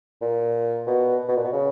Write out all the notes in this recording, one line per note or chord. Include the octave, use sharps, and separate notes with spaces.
A#2
B2
B2
A#2
B2
C#3